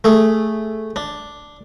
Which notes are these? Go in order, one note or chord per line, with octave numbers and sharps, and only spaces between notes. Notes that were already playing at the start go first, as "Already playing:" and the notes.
A3 G#4
D4